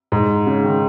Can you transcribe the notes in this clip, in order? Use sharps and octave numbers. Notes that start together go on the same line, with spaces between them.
G#2
C#3
D#3